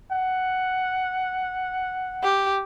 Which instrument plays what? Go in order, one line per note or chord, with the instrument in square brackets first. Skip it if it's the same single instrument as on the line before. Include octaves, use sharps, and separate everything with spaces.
[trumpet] F#5
[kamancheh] G4